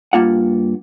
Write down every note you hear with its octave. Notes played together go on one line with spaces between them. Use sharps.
G2 A#3 F4 F#5